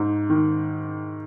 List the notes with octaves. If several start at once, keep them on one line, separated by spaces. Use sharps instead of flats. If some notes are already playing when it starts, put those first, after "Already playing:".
Already playing: G#2
D#3